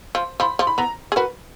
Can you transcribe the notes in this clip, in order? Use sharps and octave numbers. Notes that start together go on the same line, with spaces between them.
F3
F3 B5
F3
B5
B3 A#5
G#4
F#4 A#4 B4